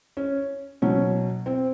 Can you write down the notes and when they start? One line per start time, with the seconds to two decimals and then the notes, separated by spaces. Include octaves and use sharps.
0.17 C#4
0.82 B2 F#3 C#4
1.46 C4